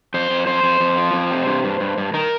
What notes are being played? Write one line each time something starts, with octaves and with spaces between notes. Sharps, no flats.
F2 C5
F2
F2 C5
F2
F2
F3
F2
C3
G2
G2
G2
G2
D#3 A#4